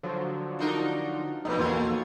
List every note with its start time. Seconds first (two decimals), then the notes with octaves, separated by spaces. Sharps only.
0.03 D3 F3 F#3
0.59 D4 D#4 A#4
1.45 A#1 F2 A#2 D#4 B4
1.59 E2 A#3 F4 F#4 C#5 G#6